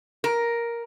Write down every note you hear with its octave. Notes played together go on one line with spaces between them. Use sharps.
A#4